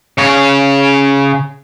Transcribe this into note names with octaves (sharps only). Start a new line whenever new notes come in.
C#3 C#5